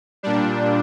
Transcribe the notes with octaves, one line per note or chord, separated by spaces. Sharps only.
A#2 G3 D4